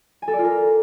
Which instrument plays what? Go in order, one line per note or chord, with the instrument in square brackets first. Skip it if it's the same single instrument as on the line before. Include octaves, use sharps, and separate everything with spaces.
[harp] G#5
A4
D5
F4
A#4